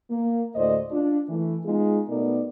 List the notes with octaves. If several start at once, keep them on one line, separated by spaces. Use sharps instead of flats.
A#3
D2 A2 C5 D5 D#5
D4 F4
E3 A3
G#3 B3 D#4 F4 G#4
B2 A3 B3 D#4 A#4 D5